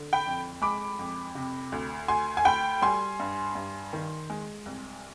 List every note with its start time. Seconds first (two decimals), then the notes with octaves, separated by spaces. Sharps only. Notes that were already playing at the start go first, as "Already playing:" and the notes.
Already playing: D3
0.13 G5 B5
0.26 F2
0.62 G#3 B5 D6
0.99 F2
1.35 C3
1.72 D2
2.08 D2 G#5 C6
2.37 G#5
2.45 D2 G5 B5
2.82 G3 G#5 C6
3.20 G2
3.55 G2
3.93 D#3
4.30 G#3
4.66 C2